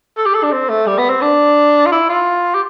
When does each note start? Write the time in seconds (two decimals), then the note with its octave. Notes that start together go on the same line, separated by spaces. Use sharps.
0.17 A4
0.25 G4
0.34 A4
0.43 D4
0.52 C4
0.69 A3
0.86 G3
0.98 B3
1.10 C4
1.21 D4
1.86 F4
1.92 E4
2.09 F4
2.54 G4